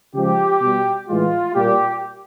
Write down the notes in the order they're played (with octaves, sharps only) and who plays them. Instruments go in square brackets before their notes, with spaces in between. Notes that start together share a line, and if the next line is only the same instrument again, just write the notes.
[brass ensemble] C#3 F3 G#3 G4
B2 G3
A2 E3 G#3 F4
A#2 G3 G4